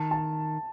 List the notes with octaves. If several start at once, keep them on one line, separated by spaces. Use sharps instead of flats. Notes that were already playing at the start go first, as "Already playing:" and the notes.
Already playing: D#3 A5
A5